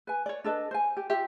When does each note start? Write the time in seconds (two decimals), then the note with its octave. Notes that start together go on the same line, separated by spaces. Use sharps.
0.07 B4 G#5
0.26 C#5 D5
0.44 D4 A4 B4 D#5
0.71 C5 G#5
0.97 G4
1.10 F4 G4 E5